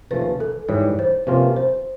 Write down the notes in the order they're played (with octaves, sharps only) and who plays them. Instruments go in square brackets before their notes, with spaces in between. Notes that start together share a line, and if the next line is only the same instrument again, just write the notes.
[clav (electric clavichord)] D#2 C#3 F3 A3 C#4 [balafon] B4
[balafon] A4
[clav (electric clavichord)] G#2 E3 G3 [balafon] C#5
[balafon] C5
[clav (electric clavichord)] C3 F3 A#3 C#4 F4 [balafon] B4
[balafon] C5